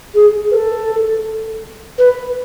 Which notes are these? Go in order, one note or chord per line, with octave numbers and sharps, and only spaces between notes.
G#4
B4
A4
B4